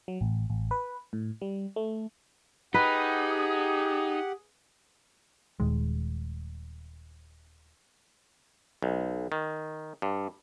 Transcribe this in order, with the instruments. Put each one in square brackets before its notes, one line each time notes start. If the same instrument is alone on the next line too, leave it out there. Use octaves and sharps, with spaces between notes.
[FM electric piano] F#3
A1
A1
B4
A2
G3
A3
[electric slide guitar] D#4 [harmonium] G4 F#5 [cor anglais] G#4 [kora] B4
[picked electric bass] D#1 D#3 G#3
[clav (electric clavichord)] B1
D#3
G2